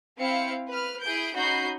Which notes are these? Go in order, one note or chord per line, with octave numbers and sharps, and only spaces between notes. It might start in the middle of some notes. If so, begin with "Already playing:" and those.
C4 E4 F5 G5 C#7
B4 F6
E4 G#4 G6 D7
C#4 D#4 F#4 B5 G6 C7